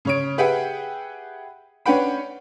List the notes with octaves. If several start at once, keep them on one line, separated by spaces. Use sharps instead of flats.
C#3 C#5 D7
G4 G#4 B4 E5 F#5 G5
C#4 D4 B4 F#5 G5 B5